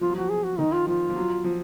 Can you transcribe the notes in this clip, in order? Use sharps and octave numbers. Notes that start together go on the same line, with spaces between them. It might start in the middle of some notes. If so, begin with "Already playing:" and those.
F3 F4
F#3
F3 F#4
G#4
F#4
D#3 D#4
F4
F3 F4
F3
F#3
F3